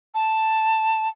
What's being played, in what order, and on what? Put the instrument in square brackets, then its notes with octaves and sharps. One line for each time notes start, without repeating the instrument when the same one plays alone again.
[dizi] A5